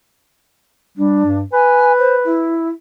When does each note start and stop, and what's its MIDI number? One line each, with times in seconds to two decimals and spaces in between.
0.97 1.21 55
0.97 1.37 62
1.25 1.43 43
1.53 2.58 71
1.53 1.92 80
1.99 2.15 72
2.25 2.69 64